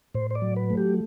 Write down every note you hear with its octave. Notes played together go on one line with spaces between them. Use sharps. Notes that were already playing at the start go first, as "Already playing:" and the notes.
A2 C5
C5
D5
F#3
B4
A3
G4